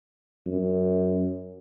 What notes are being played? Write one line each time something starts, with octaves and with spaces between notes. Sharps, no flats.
F#2